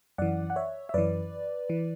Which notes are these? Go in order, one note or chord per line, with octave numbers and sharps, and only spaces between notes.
F#2 E3 D5 F#5
F#5
C#5 E5
E5
F#2 E3 B4 D5
E3